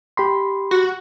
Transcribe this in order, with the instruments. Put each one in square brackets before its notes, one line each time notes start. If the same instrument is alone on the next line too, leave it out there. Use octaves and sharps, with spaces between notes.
[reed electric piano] G4 B5 C6
[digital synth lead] F#4